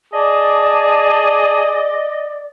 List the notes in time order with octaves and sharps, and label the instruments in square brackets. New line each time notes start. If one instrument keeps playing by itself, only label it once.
[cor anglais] G#4 [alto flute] D5 [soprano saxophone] D#5 [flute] A5